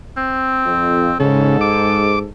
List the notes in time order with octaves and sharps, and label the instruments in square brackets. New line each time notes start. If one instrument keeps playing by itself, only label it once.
[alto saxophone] C4
[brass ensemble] F2
[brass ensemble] G#2 [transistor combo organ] C#3 [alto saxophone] A4
[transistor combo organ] D6